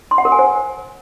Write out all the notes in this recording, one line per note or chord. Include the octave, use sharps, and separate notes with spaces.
C6
F#5
A#4
G#5
C5